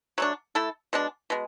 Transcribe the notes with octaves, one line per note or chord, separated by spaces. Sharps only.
F#3 A3 D4
A3 E4 A4
B2 G#3 D4
B2 G#3